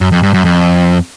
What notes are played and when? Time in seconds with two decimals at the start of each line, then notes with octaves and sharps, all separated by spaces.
0.01 F#2
0.12 F2
0.23 G2
0.34 F#2
0.45 F2